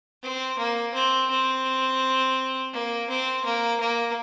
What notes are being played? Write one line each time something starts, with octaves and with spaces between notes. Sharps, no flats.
C4
A#3
C4
C4
A#3
C4
A#3
A#3